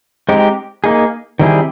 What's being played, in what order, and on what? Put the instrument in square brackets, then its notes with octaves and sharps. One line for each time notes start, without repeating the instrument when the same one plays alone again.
[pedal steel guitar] G#3 C4 D#4 G4
A#3 D#4 G#4
D#3 G3 C4 E4 G#4